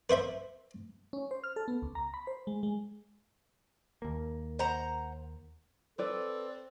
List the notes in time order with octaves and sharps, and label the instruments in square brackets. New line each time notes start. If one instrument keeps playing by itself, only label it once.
[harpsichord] B4 C5 E5 B5
[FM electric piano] C#4
C5
F6
A4
B3
C#2
A#5
B5
C5
G#3
G#3
[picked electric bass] D#2 A#3
[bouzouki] C5 F#5 A#5
[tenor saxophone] C4 [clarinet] A4 [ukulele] B4 D5